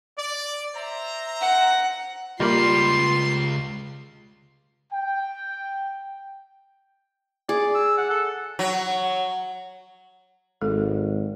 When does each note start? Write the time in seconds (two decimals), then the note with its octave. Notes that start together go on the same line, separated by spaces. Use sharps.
0.17 D5
0.75 C5 E5 A#5
1.41 F#5
2.40 C#2 G3 A#3 F4 B5 C6
4.93 G5
7.49 G#4 D5
7.75 E6
7.98 F#5
8.10 A4
8.59 F#3
10.61 G#1 G#3 A4